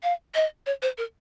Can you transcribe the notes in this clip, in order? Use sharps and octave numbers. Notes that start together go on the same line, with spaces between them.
F5
D#5
C#5
C5
A#4